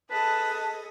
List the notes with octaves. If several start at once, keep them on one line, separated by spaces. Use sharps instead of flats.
G#4 A4 B4 D#5 A5